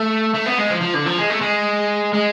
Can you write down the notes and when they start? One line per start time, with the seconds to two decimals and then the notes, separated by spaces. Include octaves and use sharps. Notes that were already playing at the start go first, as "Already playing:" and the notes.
Already playing: A3
0.35 A3
0.47 B3
0.59 G#3
0.71 F3
0.82 F3
0.94 D3
1.06 F3
1.18 G#3
1.30 A3
1.41 G#3
2.13 G#3